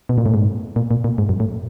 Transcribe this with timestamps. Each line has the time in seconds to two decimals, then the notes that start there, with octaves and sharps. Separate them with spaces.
0.09 B2
0.18 A#2
0.26 A2
0.34 G#2
0.76 A#2
0.91 A#2
1.04 A#2
1.18 G#2
1.29 F#2
1.40 A2